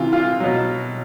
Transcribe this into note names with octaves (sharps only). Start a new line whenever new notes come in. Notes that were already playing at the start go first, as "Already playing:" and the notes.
Already playing: C3 E3 F4
F4
B2 F#3